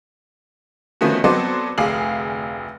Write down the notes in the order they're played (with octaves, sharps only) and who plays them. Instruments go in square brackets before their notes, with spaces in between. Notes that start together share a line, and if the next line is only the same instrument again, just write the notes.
[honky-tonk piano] D#3 F3 A3 B3 C#4 F#4
F#3 B3 C4 A4 C5 D5
F1 D2 G#4 F5 F#7